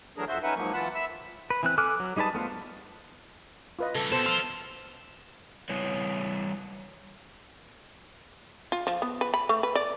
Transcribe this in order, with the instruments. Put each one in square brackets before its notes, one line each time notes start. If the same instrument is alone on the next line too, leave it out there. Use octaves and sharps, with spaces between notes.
[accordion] E3 F#3 A3 D4 G#4 A#4
F2 F#4 C5 E5 G6
C#4 D#4 B4 E5 F#5
G#2 F3 F#3 A#3 C#6
E3 F4 F#5 A5 B5 F#6
E5 B5 E6
[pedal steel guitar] B4
E3 C4 F#6
A4 G#5 D6 F6 F#6
F#3
G3 D#4 G#4 B4 A5
A3 B3 F4 C5
[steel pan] F4 B4 D#5
[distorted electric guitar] C#3 G3 [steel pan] A4
[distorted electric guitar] B2 [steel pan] A4 C5 [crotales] E7
[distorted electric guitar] C5 F5 [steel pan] C6 E6
[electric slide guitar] G3 E4 B4 C#5
[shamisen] F4
F3
B3
B4
B5
A3
B4
D5